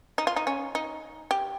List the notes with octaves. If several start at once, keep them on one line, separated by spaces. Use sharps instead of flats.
D#4
F4
D#4
C#4
D#4
G4